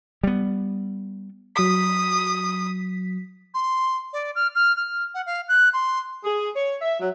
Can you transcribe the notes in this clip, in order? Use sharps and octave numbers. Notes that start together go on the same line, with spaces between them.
G3 B3
F#3 D#6 B6
C6
D5
F6
F6
F6
F#5
F5
F#6
C6
G#4
C#5
E5
F#3